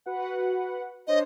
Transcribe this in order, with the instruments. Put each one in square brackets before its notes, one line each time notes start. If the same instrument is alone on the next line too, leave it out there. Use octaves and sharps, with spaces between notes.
[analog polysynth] F#4 B4 F#5
[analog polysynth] D4 C5 C#5 [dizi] D#5